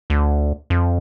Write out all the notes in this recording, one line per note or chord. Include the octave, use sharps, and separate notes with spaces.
D2
F2